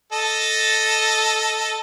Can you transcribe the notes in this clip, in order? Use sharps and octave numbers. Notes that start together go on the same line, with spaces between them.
A4 D#5 A5